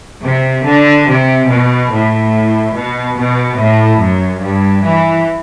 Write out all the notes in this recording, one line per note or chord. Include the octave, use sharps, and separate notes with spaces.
C3
D3
C3
B2
A2
B2
B2
A2
F#2
G2
E3